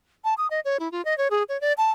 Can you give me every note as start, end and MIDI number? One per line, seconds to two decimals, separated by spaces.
0.24 0.34 81
0.38 0.47 87
0.51 0.60 75
0.65 0.77 73
0.80 0.91 64
0.92 1.04 65
1.05 1.17 75
1.18 1.28 73
1.31 1.43 68
1.49 1.60 73
1.61 1.73 74
1.78 1.92 81